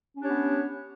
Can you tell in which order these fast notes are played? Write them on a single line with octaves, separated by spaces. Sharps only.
C#4 D4 G4 C#5 B3